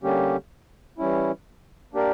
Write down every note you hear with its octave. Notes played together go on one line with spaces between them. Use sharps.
D3 G3 A#3 C#4 G4
E3 G3 C#4 E4
A#3 D4 G4 A#4 D5